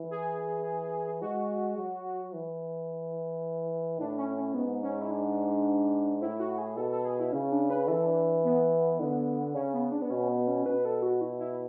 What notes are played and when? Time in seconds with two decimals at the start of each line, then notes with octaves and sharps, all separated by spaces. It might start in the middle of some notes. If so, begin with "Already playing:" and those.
Already playing: E3
0.11 G#4
1.21 G#3 F#4
1.77 F#3
2.33 E3
4.00 A2 D4
4.18 C#4
4.37 C#4
4.54 G#2 B3
4.83 C#4
5.01 E4
5.11 D4
6.21 A2 E4
6.40 F#4
6.58 G#4
6.77 B2 A4
6.92 A4
7.05 G#4
7.20 E4
7.32 C#3 C#4
7.52 D4
7.70 B4
7.88 E3 A4
8.07 D4
8.44 B3
9.00 D3
9.54 C#3 C#4
9.74 B3
9.92 D4
10.02 B3
10.10 B2 C#4
10.29 B3
10.47 C#4
10.66 B2 B4
10.85 A4
11.03 F#4
11.21 E4
11.40 E4